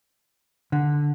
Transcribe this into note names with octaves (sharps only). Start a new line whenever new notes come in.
D3